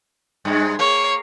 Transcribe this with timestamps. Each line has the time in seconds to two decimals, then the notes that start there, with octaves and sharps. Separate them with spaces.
0.45 G2 G#3
0.79 A#3 C#5